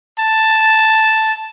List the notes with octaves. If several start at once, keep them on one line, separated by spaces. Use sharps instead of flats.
A5